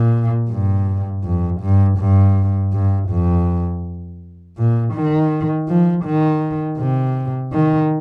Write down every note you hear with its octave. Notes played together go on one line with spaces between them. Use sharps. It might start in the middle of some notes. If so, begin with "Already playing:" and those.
Already playing: A#2
G2
F2
G2
G2
G2
F2
A#2
D#3
F3
D#3
C3
D#3